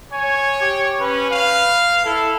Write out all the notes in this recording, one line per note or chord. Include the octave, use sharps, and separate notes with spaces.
C#5 G#5
G4
C#4 B4
F5
E4 A4